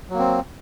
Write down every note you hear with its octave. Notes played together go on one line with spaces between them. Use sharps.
F#3 A#3 C4